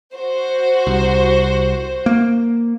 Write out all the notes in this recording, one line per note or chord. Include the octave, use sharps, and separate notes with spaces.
F#4 C5
C2
A#3